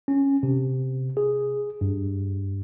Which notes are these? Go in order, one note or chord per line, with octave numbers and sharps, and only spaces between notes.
C#4
C3
G#4
G2